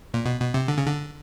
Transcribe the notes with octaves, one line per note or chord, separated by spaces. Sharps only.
A#2
B2
B2
C3
D3
C#3
D3